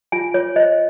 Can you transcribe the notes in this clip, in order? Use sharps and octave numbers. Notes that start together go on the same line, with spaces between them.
F4 G#5
F4 C#5
C5 D#5